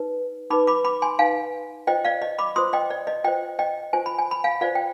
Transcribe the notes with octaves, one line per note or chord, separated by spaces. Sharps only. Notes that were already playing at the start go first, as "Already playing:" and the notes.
Already playing: D#4 B4
D#4 B4 B5 D6
B5 D6
B5 D6
G#5 C6
D#4 B4 F5 G#5
F4 C5 D#5 G5
D5 F5
D#5
B5 D6
F4 C5 C6 D#6
D#5 G5
D5
D#5
F4 C5 D#5 G5
D#5 G5
F4 C5 G#5
B5
G#5
B5
F5 G#5
F4 C5 D5 F5
G5